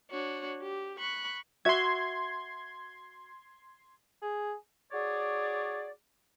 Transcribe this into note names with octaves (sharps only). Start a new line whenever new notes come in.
D4 F#4 C#5
G4
B5 C#6 F#6
F#4 E5 C6 G#6
G#4
F#4 G#4 C#5 D5